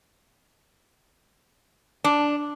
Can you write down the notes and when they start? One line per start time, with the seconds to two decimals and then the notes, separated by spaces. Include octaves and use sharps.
2.04 D4